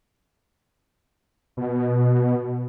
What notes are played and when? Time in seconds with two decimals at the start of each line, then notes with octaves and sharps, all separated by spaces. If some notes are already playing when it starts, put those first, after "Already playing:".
1.57 B2